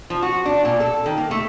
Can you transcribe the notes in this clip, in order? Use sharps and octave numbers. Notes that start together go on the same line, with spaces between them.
F3
F#4
D4
A#2
A4
D#3
A#3
A3